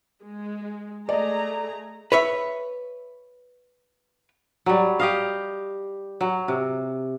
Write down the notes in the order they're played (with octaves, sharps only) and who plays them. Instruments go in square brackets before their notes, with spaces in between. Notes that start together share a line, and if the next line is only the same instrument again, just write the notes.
[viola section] G#3
[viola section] A3 G#4 A#5 [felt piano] D5 D#5
[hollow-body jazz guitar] B4 C#5 E5
[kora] F#3 G3
G4 D#5 F5
F#3
C3